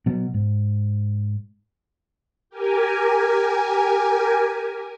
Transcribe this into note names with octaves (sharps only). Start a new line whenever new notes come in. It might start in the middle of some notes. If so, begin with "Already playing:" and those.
B2 F#3
G#2
G4 A#4 G#5